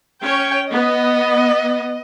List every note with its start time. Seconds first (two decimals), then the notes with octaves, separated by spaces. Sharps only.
0.22 C#4 C#5 G5
0.71 B3 D#5